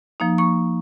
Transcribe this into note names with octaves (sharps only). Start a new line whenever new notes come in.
F3 A#3 D#4
A#3 C#6